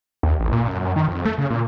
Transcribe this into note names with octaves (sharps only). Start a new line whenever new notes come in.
D#2
A1
A#2
F#2
F#2
D#3
F2
A3
C#3
A#2